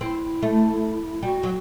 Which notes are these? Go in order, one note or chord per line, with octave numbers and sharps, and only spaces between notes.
C4 E4
A3
G3 F#4
F#3